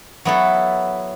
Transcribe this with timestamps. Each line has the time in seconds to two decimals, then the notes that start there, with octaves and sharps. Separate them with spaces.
0.25 F#3 B3 E4 A4